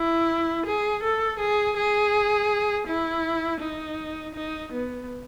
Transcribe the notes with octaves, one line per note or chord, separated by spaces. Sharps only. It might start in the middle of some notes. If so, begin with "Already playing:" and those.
Already playing: E4
G#4
A4
G#4
G#4
E4
D#4
D#4
B3